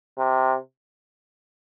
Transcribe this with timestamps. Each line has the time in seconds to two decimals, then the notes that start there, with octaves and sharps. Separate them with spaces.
0.18 C3